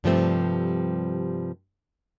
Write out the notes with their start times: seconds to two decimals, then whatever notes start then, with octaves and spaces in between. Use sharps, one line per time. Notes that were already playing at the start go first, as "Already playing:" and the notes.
0.04 G2 C3 F3 G3 A3 C4